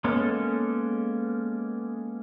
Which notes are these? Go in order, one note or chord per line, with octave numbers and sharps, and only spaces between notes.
G#3 A#3 B3 C#4 A4